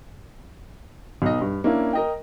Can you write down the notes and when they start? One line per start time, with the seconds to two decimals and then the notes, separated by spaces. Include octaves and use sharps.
1.22 B1 D#5
1.41 G2
1.64 A#3 C#4 D4 E4
1.93 A#4 D#5 G5